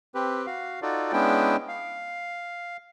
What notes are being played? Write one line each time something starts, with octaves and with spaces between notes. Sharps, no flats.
C4 G4 B4
F#4 F5
D#4 F4 F#4 A4 D5
G#3 B3 C#4 D4 E4 G5
F5